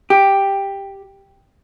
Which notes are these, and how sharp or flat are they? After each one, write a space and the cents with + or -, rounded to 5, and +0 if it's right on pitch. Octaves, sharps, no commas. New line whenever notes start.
G4 +5